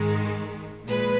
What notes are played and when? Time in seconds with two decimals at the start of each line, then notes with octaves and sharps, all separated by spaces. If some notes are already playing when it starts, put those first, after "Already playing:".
Already playing: G#2 D#3 G#3
0.87 A#2 F3 G#3 B4